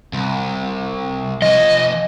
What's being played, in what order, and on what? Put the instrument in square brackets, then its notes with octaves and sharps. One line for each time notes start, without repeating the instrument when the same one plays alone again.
[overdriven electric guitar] C2
[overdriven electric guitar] F3 G#5 [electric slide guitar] D#5